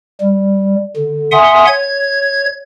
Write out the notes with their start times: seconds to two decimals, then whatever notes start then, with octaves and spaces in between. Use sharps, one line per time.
0.20 G3
0.97 D3
1.32 E5 F#5 G#5 C6 D#6
1.67 C#5 G#6